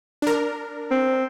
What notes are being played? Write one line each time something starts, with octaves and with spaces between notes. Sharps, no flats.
D4 A#4
C4